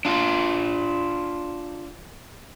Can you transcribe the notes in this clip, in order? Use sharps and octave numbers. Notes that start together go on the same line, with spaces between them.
D4 F4